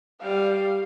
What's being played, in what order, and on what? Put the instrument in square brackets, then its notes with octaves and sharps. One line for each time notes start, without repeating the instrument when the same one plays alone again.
[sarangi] G3 [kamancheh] F5